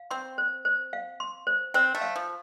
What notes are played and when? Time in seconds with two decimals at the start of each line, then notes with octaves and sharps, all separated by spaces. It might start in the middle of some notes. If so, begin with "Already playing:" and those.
Already playing: F5
0.11 C4 C6
0.38 C5
0.65 C5
0.93 F5
1.20 C6
1.47 C5
1.74 C4 C5
1.95 A3
2.01 F5
2.16 F3